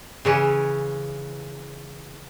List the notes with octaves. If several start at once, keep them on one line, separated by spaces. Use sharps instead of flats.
C#3 E3 C#4